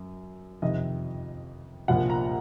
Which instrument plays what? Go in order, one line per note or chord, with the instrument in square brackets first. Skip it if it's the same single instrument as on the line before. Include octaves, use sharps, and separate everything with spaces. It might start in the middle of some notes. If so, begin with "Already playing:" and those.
Already playing: [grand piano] F#2
F2 C3 D#3 D#5
C2 A#2 F3 F#5
A#5